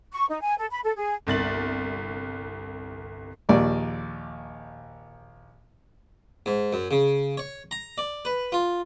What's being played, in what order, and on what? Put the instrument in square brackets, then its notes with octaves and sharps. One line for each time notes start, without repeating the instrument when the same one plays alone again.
[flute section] C#6
D#4
G#5
A4
B5
A4
G#4
[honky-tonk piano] G1 C2 A6 F#7
[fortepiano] A#1 D#2 D5
[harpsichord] G#2
F#2
C#3
C#5
A#5
D5
B4
F4